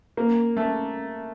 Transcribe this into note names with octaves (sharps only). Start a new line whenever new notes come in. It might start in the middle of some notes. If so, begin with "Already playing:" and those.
A#3
A3